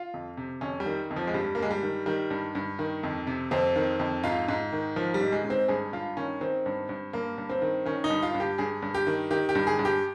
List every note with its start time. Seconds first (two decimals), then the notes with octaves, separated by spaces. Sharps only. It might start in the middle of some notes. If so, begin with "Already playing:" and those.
Already playing: F4
0.14 F2
0.37 C3
0.61 F2 C#4
0.80 G3
0.86 D#3
1.11 F2
1.16 F3
1.27 G#3
1.34 G2 G3
1.55 A#3
1.58 G2 G#3
1.71 G3
1.83 D#3
2.06 D#3 G3
2.30 G2
2.55 G2
2.79 D#3
3.03 F2
3.27 C3
3.51 F2 C4
3.76 D#3
3.99 F2
4.24 G#2 F4
4.49 G#2
4.72 D#3
4.96 D#3 F3
5.14 G3
5.21 G#2
5.32 G#3
5.44 G#2
5.50 C4
5.68 G2 G#4
5.93 G2 F4
6.17 D#3 C#4
6.41 D#3 C4
6.66 G2
6.89 G2
7.13 G2 A#3
7.38 G2
7.49 C4
7.62 D#3
7.85 D#3 C#4
8.04 D#4
8.10 G2
8.23 F4
8.34 G2
8.40 G4
8.58 G2 G#4
8.82 G2
8.94 G4
9.07 D#3
9.31 D#3 G4
9.49 G4
9.55 G2
9.67 G#4
9.79 G2
9.85 G4